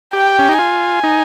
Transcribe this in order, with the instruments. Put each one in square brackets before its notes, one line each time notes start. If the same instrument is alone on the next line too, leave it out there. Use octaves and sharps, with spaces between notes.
[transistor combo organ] G4 [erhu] G5
[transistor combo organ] C#4
D#4
[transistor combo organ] F4 [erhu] G#5
[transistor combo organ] D#4